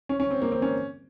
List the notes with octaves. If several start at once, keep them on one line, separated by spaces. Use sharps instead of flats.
C#4
C#4
C4
A#3
C4
C#4